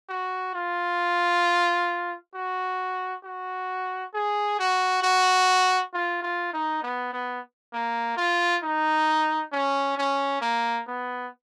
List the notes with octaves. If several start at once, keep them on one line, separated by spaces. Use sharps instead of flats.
F#4
F4
F#4
F#4
G#4
F#4
F#4
F4
F4
D#4
B3
B3
A#3
F4
D#4
C#4
C#4
A#3
B3